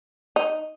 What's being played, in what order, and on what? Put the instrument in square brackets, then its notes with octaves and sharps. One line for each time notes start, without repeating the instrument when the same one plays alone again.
[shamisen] D#4